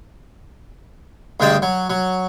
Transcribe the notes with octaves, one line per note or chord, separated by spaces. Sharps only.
D2 G2 G#3 G5 A5
F#3
F#3